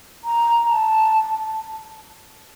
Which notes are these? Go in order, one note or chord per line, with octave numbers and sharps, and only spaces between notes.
A#5
A5